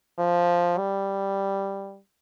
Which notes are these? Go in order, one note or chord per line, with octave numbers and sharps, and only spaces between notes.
F3
G3